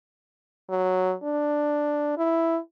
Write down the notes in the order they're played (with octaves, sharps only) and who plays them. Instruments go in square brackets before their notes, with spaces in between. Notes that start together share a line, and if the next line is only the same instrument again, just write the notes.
[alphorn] F#3
D4
E4